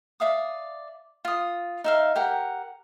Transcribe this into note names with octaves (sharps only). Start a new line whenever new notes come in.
D5 E5 F5 D#6
F4 D#6
D#4 E5 F5
G4 A#4 F#5